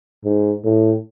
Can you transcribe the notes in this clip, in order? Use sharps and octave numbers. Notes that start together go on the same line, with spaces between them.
G#2
A2